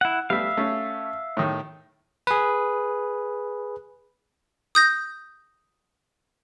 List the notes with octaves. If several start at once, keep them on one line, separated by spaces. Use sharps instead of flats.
E4 F#5
G3 A3 B3 E5 F5
A3 C#4
A2 D#3
G#4 B4
D#6 G6 A#6